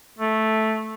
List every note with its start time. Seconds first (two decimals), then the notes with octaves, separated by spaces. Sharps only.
0.19 A3